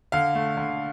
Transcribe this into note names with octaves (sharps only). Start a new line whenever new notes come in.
D3 F5
A3
D3